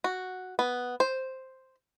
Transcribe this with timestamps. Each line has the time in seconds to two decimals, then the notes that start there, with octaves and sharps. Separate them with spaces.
0.04 F#4
0.59 B3
1.00 C5